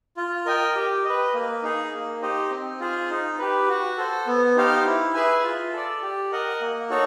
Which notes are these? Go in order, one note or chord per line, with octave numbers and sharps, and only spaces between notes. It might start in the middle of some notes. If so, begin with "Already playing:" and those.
F4
A#4 D#5 G5
G4
B4 D#5
A#3
D#4 G#4
A#3
D#4 G4 C5 D#5
C4
F4 G#4 C5
D#4
G4 B4
F#4
A4 C5
B3
D#4 G4 C5 F5
E4
G#4 B4 E5 G#5
F4
A4 D5
G4
A#4 D#5 F#5
A#3
D#4 F#4 A4 C#5